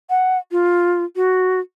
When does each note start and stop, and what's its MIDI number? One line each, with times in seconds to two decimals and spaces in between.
0.10 0.38 78
0.52 1.05 65
1.16 1.60 66